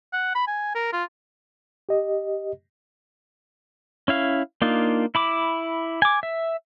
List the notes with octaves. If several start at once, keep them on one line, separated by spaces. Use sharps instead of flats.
F#5
B5
G#5
A#4
F4
G4 D#5
C#4 E4 F5
A#3 D4 D#4 F4
E4 B5 D6
G#5 D6
E5